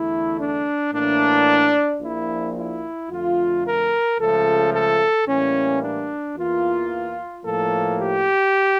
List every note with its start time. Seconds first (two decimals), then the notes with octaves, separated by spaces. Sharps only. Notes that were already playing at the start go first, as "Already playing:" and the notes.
Already playing: E2 D3 A3 E4
0.39 D4
0.93 A2 E3 A#3 D4
2.01 A#1 A#2 F3 A#3 E4
2.56 E4
3.10 F2 D3 A3 F4
3.64 A#4
4.18 C#2 C#3 F3 A3 A4
4.73 A4
5.27 A2 E3 G3 A#3 C#4
5.82 D4
6.36 E2 E3 A#3 F4
7.44 A2 F3 A#3 A4
7.99 G4